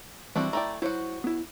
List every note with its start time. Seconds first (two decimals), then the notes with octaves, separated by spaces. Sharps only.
0.36 E3 G3 C4 D4 E4 F#4
0.53 A3 E4 D5 G5 G#5 A#5
0.82 F#3 E4 F#4 C5
1.24 B3 E4